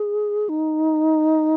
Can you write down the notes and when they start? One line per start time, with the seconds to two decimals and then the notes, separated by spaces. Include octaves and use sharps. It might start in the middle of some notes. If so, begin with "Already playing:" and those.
Already playing: G#4
0.49 D#4